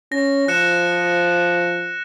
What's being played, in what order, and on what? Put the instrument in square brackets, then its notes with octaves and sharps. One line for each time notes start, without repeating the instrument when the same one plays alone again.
[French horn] C#4 [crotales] A#6
[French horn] F3 [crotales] F#6 C#7 E7